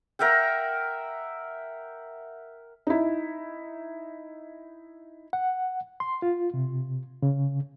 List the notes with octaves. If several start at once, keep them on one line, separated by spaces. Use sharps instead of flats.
A#4 E5 F#5 G5
D#4 E4
F#5
C6
F4
C3
C#3